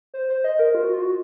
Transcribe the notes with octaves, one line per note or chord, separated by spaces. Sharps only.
C5
C5
D#5
A#4
F4
F#4
F4
F#4